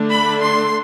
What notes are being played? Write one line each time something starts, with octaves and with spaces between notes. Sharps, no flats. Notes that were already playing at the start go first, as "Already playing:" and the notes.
Already playing: D3 A3 D4
B5
C6